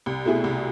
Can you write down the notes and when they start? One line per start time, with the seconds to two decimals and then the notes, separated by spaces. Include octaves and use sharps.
0.06 C2
0.25 B2 A3 E4 G#4
0.44 C2